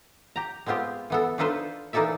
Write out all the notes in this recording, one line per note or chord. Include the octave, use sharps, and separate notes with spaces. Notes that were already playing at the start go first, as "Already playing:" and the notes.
G4 A#5
G#3 B3 C4 F4 G4
E3 B3 A4
D4 D#4 F4 A4 B4 C5
E3 A#3 D#4 A4 D5 E5